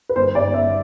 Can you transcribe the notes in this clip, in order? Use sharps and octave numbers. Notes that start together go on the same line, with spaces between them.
B4
G1 C5
G1 D5
G1 E5